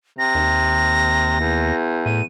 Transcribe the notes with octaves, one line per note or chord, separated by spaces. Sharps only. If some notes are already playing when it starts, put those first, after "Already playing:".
C3 A#6
D#2
E2
A2 D#7